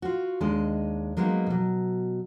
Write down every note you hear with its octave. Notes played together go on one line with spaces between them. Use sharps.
F4 F#4
D#2 G#3 D4 D#5
F#3 G#3 A#3 B3 D#4
B2 F#3